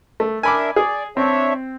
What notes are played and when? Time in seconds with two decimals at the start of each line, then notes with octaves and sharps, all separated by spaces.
0.20 A3
0.43 D4 A#4 E5 G#5 B5 D6
0.76 G#4 D5
1.17 C4 D4 C#5 E5